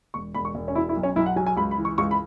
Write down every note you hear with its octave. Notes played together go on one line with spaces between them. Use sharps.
E1 C#6
E1 B5
C#6
E1
C#4
B2 E4
E4
B1
C#4
B1 E4
F#5
F#3 G#5
G#5
C#2 B5
B5
E3
C#6
C#2 C#6
B5